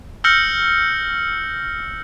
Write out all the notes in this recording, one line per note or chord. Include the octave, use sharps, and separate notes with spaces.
E6 F6 G6 A#6 C#7 F#7